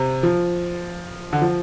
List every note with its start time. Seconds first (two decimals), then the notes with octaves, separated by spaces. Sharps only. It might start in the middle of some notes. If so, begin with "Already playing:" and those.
Already playing: C3
0.23 F3
1.33 D3
1.42 F3